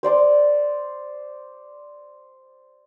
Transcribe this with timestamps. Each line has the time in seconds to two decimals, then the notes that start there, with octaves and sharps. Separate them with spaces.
0.03 C5 D5 C6 D6